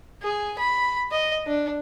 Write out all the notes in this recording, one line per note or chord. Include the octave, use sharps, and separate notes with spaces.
G#4
B5
D#5
D4